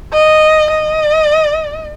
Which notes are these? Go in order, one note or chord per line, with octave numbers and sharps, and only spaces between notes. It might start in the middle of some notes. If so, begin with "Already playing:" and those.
D#5
D#5